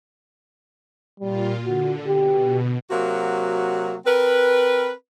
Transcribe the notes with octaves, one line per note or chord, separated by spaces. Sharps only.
A#2 G3 F4
D3 F#4
B2 G4
C3 F#3 A#3 F#4
C4 A#4 B4